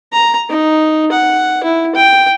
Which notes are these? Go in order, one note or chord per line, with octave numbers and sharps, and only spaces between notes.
A#5
D#4
F#5
E4
G5